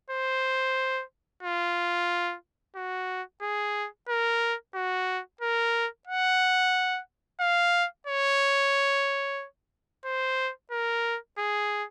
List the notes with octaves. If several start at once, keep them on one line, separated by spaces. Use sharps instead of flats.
C5
F4
F#4
G#4
A#4
F#4
A#4
F#5
F5
C#5
C5
A#4
G#4